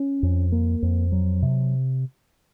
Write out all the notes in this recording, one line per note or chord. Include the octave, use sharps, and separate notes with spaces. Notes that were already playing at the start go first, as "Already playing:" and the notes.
Already playing: C#4
F2
A#3
F2
F#3
C3